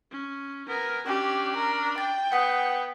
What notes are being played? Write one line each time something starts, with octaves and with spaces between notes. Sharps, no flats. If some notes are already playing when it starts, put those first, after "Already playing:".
C#4
B3 A#4 G#5
C#4 D4 G4
A#4
G5 A6
B3 F#5 D#6 C#7